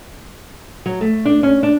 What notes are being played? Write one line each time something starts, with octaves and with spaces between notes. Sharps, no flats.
F#3
A3
D4
C#4
D4